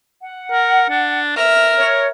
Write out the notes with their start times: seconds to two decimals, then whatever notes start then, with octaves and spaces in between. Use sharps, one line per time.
0.21 F#5
0.52 A#4
0.90 D4
1.37 A#4 E5 F6
1.78 C#5